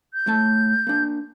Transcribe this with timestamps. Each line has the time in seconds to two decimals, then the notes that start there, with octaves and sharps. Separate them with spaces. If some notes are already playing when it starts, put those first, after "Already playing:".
0.14 G6
0.26 A2 A3 A5
0.87 A#3 D4